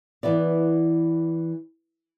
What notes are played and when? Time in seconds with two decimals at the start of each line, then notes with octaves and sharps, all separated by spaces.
0.23 E3 B3 E4 D5